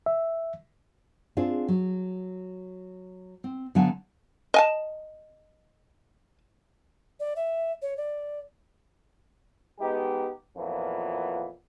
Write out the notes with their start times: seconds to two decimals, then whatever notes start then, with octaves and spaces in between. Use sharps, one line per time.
0.06 E5
1.37 C4 D4 F4 G#4
1.68 F#3
3.44 C4
3.75 D3 F#3 B3 F5 G#5 A5
4.54 D#5 G#5 A5
7.20 D5
7.36 E5
7.82 C#5
7.97 D5
9.80 G#3 B3 D#4 G4
10.56 F2 A#2 E3 F#3 B3